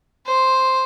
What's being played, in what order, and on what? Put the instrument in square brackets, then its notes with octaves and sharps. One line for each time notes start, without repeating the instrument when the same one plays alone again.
[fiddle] C5